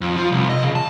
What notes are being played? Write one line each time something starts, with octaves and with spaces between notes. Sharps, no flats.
F2
F3
C2
D#5
C#3
A5